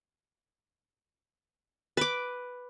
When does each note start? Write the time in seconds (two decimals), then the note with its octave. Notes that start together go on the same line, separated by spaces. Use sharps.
1.97 B4 D6